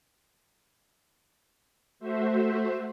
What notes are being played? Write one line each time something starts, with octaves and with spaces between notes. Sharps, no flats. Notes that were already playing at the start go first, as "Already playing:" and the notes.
A3 F#4 C5 E5